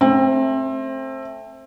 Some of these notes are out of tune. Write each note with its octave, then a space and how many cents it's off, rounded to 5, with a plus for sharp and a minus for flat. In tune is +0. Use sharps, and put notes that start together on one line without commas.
A3 +0 C4 +25